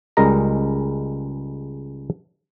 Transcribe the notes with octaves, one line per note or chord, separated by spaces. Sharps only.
C#2 G3 G#3 A#4 D#5 A#5